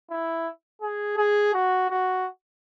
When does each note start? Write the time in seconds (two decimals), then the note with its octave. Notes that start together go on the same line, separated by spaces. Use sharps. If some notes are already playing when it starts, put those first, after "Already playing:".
0.11 E4
0.81 G#4
1.17 G#4
1.54 F#4
1.90 F#4